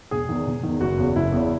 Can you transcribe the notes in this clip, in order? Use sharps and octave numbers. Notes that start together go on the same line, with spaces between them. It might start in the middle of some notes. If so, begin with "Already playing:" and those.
E1 G#4
E2 D#3
E1
E2 D#3
F#1 F#4
E2 C#3
F#1 E4
E2 C#3